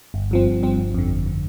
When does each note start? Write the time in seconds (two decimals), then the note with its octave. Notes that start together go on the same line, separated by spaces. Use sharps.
0.14 G1
0.31 G2 F3 C4
0.47 G1
0.63 G2 F3 C4
0.78 G1
0.94 F2 D3
1.09 G1
1.26 D3